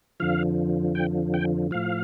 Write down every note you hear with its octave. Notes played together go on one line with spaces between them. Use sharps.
F2 D3 F3 F5
G5
G5
A2 F3 F5